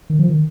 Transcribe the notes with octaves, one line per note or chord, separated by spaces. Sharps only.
D#3
F3
D#3